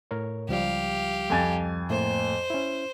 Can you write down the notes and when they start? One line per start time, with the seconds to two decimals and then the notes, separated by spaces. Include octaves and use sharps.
0.11 A2 A#4 C#5
0.49 C#2 F3 G3 G4 F5
1.30 F2 G#5 A6
1.90 A2 A3 A#3 C5
2.50 C#4 E4